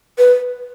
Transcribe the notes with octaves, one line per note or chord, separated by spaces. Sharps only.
B4